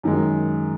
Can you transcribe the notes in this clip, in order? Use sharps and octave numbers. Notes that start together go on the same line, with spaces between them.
F#2 D#3 G#3